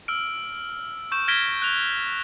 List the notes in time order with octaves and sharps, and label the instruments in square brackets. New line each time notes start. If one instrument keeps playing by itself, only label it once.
[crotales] E6 F6 D7
C#6 G6 E7
F6 G#6 A#6 B6 D7 G7
F#6 F7